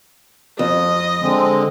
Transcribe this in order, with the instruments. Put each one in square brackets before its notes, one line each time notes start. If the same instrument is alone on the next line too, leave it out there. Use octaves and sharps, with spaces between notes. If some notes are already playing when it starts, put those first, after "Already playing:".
[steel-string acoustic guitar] F2 [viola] D#5
[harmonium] D3 G#3 C4